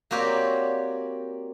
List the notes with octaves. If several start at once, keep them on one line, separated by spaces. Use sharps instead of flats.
A#3 C4 F#4 G4 C#5 D5